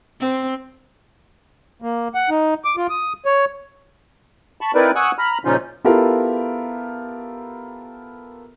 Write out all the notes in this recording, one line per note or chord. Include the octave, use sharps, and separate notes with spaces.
C4
A#3
F#5
D#4
D6
F4
D#6
C#5
A5 B5 C#6
C4 D#4 E4 A#4 B4 D5
F#5 G#5 C#6 D#6 E6 F#6
A#5 B5 F6
A#2 C#3 F3 C#4 D#4 F4
B3 E4 F4 G4 A4 A#4